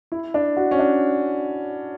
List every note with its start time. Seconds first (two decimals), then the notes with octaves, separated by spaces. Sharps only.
0.12 E4
0.34 D4
0.57 F#4
0.71 C#4
0.79 D4